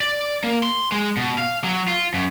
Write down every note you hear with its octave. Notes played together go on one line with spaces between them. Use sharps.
D5
A#3
C6
G#3
B2
F5
F#3
F4
F#2